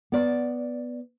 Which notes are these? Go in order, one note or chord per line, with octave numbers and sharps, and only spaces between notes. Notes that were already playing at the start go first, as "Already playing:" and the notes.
B3 D5